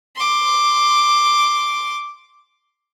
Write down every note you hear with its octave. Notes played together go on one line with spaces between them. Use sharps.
C6 D6